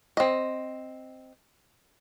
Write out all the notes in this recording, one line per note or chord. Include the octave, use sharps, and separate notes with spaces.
C4 D#5